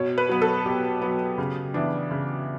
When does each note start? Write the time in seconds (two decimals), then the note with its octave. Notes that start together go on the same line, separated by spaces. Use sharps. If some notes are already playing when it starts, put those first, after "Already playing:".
Already playing: B2 C#5
0.18 B4
0.29 F#3 B3
0.42 A4
0.66 B2 G4
1.02 F#3 B3
1.38 C#3
1.74 E3 B3 D4
2.11 C#3